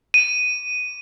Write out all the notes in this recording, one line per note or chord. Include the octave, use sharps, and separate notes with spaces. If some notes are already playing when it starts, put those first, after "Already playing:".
D#7